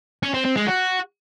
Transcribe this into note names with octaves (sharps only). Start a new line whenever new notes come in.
C#4
C4
C4
G#3
F#4